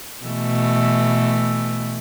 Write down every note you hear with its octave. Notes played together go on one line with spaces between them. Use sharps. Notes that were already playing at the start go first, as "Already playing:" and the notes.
B2 E3 A3